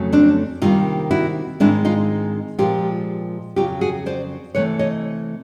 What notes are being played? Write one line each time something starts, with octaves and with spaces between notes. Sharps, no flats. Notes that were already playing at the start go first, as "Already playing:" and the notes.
Already playing: F2 C#3 F#3 A3
C4 D4
C3 D#3 G3 A#3 D#4 F4
E4 F#4
G#2 D#3 G#3 C4 D4 E4
D#4 F4
A#2 F3 G#3 F4 G4
F2 C#3 F#3 F4 G4
F#4 G#4
C5 D5
C3 E3 A3 B4 C#5
C#5 D#5